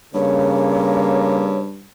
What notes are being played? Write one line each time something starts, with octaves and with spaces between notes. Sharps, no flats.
G2 C#3 A#3 C#5